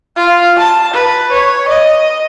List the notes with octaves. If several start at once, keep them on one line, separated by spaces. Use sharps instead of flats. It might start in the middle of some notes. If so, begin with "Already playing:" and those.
F4
A5
B4
C#5
D#5